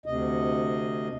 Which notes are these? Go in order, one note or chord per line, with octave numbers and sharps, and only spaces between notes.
D2 C3 D#5